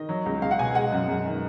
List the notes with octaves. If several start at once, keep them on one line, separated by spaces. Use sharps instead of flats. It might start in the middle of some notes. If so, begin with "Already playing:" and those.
Already playing: D#3 D#5
F#3
C#2
C#2 F5
F#5
B2 G#5
G#3 F#5
F#2
F#2
D#3